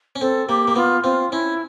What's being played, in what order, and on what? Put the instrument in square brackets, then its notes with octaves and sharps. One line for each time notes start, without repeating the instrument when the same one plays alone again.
[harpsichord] C#4
[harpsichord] C4 [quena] A4
[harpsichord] A#3 [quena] G4
[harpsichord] A#3
[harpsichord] B3 [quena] F4
[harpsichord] C4 [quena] F4
[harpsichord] C#4 [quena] E4